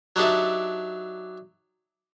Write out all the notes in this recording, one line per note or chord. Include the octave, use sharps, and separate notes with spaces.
F#3 D4 D#4 G4 A4 E5